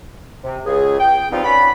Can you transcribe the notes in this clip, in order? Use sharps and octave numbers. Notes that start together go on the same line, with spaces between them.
C3
C#2 G#4
G5
F3 G3 B3 C4 D#4 F4
C#4 D5 F#5 B5